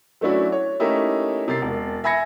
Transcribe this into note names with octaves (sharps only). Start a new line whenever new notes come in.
F#3 A3 C#4 D4 E4 F#4
C#5
A3 A#3 C#4 D#4 E4 G4
C3 A#4 A6 C7
E1
E5 G#5 B5 G#6 A#6 C#7